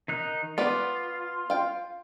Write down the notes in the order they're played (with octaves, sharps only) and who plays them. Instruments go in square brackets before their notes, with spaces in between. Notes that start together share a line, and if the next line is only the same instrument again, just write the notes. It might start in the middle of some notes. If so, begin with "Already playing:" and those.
[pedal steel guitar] D#3 D#4 F#6
[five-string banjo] B3 B4 D5 [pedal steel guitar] F4
[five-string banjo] F5 G5